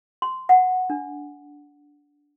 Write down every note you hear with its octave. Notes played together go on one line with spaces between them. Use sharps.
C6
F#5
D4